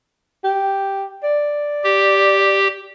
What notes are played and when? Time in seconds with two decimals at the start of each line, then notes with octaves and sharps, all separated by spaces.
0.44 G4
1.23 D5
1.84 G4